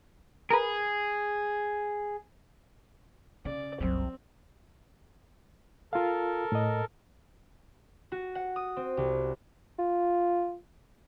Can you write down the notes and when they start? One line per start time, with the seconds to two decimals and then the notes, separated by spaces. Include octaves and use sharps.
0.50 G#4 A#4 B4
3.45 C#3 D5
3.80 F#1 C2 F#3 C4
5.93 F4 A4 A#4 F5
6.52 A2 D#5
8.12 F#4
8.35 F#5
8.56 D#6
8.77 C4
8.97 C2
9.79 F4